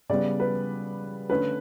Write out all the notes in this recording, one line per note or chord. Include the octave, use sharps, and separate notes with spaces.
C#3 G3 B3 D5
B4
D3 A3 C#4 B4